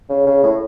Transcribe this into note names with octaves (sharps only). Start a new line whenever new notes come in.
C#3
C#3
A2